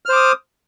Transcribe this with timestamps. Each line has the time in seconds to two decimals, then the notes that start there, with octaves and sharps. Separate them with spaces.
0.06 F6
0.09 C5
0.13 D6
0.16 D#6